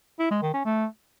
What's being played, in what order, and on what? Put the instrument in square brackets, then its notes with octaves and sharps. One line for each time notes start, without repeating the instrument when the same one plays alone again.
[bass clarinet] E4
G#3
D#3
C#4
A3